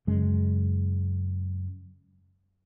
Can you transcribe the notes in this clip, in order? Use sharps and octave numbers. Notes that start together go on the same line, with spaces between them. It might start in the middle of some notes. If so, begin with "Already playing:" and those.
F#2 C#3 G#3